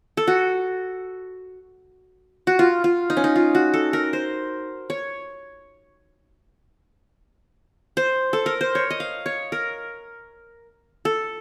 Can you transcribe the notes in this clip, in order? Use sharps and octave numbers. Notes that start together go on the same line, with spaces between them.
A4
F#4
F#4
F4
F4
D#4
C#4
D#4
F4
F#4
A4
A#4
C5
C#5
C5
A4
A#4
C5
C#5
D#5
F5
C#5
A#4
A4